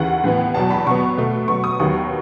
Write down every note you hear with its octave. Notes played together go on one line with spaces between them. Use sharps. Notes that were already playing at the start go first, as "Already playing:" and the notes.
Already playing: D#2 C#3 E3 F#5
A2 E3 B3
E2 B2 F#3 A5
B5
B2 F#3 B3 C#6
B2 A3
B2 F#3 B3 C#6
D#6
D#2 D#3 F#3 B3 C#6